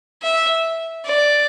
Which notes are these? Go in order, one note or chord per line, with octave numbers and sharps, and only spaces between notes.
E5
D5